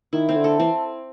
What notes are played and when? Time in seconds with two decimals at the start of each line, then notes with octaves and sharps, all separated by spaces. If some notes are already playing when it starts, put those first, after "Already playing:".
0.13 D#3 E4
0.29 C4
0.36 D3
0.44 A4
0.59 E3 C4